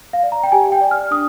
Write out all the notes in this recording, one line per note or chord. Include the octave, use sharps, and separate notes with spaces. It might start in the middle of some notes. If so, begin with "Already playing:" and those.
F5
D5
A#5
G5
G4 G#5
G5
D5
F6
D4 D#6